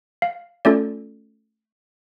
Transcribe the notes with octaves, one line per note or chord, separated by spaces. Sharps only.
F5
A3 C#4 F4 A4 D5